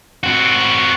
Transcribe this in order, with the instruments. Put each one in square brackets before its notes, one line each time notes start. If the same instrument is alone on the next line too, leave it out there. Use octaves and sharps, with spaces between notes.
[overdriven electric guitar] C4 F#4